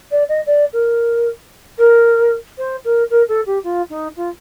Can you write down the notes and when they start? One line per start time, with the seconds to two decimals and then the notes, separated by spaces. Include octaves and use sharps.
0.11 D5
0.29 D#5
0.46 D5
0.73 A#4
1.78 A#4
2.58 C5
2.84 A#4
3.10 A#4
3.28 A4
3.46 G4
3.63 F4
3.89 D#4
4.16 F4